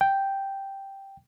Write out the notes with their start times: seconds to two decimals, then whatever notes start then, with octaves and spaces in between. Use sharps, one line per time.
0.01 G5